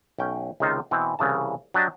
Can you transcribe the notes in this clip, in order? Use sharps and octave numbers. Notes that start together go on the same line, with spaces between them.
B1 C#4 G5
C#2 C3 D#3 D#4 F4 C5
B2 E3 C4
C2 C#3 E3 A5
F#3 D4 G4 D#5 A5